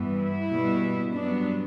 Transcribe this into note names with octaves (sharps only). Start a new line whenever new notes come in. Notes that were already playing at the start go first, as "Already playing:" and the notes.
Already playing: G2 E3 B3
E4
B2 G3 B3
G2 F#3 B3 D4